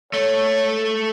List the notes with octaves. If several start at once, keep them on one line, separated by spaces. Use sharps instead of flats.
A3 C#5